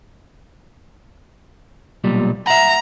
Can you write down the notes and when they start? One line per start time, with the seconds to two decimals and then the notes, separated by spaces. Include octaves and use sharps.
2.04 B1 A#2 G3
2.47 E5 F#5 A#5